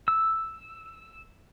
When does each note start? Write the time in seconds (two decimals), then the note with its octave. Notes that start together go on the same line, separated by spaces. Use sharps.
0.08 E6